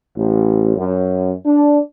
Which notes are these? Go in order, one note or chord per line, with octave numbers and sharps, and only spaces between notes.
A1
F#2
D4